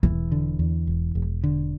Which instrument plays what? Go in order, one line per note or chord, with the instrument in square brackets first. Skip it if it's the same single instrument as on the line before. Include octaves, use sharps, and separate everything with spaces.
[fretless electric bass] E1 [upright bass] E3
[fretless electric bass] D3
E2
E1
E1
D3